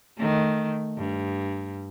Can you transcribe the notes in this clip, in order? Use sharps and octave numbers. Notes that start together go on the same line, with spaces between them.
D#3 A3
G2